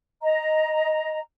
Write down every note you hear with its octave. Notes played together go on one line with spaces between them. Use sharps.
D#5 A#5